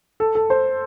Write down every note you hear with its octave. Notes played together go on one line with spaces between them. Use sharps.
A4
A4
C5